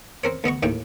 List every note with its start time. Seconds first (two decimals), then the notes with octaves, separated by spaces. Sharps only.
0.24 C4 A#4 C#5
0.44 D2 B3 D#5 C#6
0.63 D#2 A2 D#3 G5